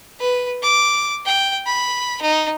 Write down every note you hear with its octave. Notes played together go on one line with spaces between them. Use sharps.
B4
D6
G5
B5
D#4